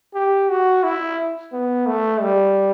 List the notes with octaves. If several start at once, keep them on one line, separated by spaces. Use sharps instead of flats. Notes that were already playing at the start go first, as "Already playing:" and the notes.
G4
F#4
E4
B3
A3
G3